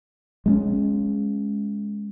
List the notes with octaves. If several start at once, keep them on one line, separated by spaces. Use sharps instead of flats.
G#3 A3 C#4